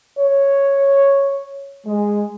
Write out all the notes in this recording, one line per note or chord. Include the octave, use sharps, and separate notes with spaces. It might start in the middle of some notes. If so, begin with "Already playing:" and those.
C#5
G#3